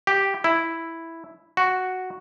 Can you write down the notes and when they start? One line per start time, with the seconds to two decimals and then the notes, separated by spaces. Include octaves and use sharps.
0.07 G4
0.44 E4
1.57 F#4